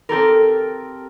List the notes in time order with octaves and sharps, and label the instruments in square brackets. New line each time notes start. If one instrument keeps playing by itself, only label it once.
[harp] C4 G4 A4 A#4